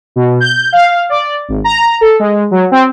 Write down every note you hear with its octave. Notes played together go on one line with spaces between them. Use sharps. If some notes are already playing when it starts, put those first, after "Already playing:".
B2
G6
F5
D5
G#1
A#5
A4
G#3
F#3
C4